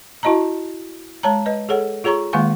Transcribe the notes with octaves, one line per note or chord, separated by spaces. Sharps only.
E4 F#4 D#5 A5 A#5
G#3 C#5 A5 A#5
B4 D#5
G#4 A4 C#5 F#5
F4 G#4 C#5 A#5 C#6
D#3 G#3 A#3 F5 G#5 C#6